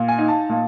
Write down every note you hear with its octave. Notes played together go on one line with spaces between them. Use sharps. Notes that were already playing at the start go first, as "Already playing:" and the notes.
Already playing: A#2
G#5
D#4
A5
A#2